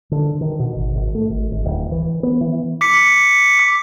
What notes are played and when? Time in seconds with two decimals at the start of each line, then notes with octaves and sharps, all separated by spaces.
0.12 D3
0.41 D#3
0.59 B2
0.75 G#1
0.95 G#1
1.15 A3
1.30 G#1
1.51 G#1
1.65 D1
1.92 E3
2.23 B3
2.41 E3
2.81 D6 B6 C#7